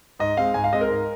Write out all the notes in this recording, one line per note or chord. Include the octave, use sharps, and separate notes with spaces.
G#2 D#5
G#3 C4 F5
G#2 G#5
F5
G#3 C4 D#5
A#4
G#2